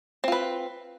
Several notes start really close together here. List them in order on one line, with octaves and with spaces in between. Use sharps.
C4 F4 B4